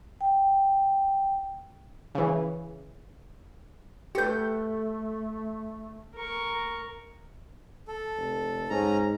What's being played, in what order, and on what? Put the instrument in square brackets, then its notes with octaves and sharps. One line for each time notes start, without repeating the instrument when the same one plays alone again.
[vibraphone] G5
[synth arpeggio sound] C#3 E3
[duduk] A3 [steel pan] G4 B4 [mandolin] A4 G6
[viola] A#4 C#6
[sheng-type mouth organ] A4
[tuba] F1
[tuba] G#2 [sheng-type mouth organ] C#4 A#5